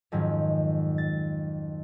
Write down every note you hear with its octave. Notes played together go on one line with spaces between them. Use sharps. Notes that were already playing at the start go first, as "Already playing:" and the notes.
F2 G#2 D#3 F3 F#3 C#4
A6